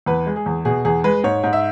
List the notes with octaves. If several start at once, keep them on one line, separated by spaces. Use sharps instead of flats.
E2 B4
G#3
G#4
E2
B2 G#4
E2 G#4
G#3 B4
G#2 C#5
G#2
E5